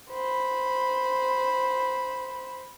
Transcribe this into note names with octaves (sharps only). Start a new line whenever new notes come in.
C5 B5